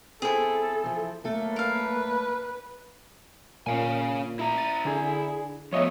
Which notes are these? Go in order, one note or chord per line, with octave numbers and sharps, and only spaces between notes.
C4 E4 G#4 A4
E3 F3
F#2 A3 A#3 A4
A#4 B4 F5
A#2 C#4 F5 G#5
E4 E5 A#5
A6 D#7
D3 G#4
F3 A3 B3 C#5 D#5 E5